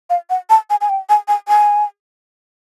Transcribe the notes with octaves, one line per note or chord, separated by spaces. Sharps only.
F5
F#5
A5
G#5
G#5
G5
G#5
G#5
G#5